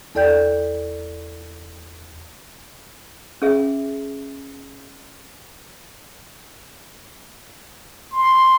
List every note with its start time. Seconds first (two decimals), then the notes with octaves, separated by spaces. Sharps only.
0.15 E2 A4 D5 G5 G6
3.42 C#4 G#4 E5
8.11 C6